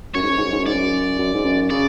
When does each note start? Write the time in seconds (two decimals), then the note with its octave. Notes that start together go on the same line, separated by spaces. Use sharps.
0.15 F#2 C#5
0.22 G#2
0.29 F#2
0.38 G#2
0.45 F#2
0.52 G#2
0.59 F#2
0.67 G#2 D5
0.74 F#2
1.18 F#2
1.34 G#2
1.44 F#2
1.70 C#3 D5